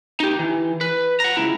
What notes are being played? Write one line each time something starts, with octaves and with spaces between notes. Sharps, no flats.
D#4 G4
E3
B4
F#5 A#5
C#2 E4